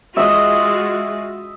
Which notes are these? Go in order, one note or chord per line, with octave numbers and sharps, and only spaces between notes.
G#3 F4 F#4 D#5 E5